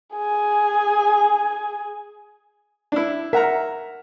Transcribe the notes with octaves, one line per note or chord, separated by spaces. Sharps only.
G#4 G#5
D4 E4
A#4 E5 F#5 A#5